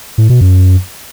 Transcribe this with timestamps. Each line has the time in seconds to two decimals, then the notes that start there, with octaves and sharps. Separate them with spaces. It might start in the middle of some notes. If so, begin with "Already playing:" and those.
0.18 A2
0.29 B2
0.41 F#2